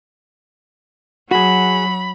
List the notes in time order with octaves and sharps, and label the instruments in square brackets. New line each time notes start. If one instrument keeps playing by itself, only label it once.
[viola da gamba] F#3 [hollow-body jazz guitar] F#4 G#4 [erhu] B5